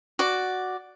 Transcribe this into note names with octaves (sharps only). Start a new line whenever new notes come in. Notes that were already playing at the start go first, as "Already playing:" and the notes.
F#4 D5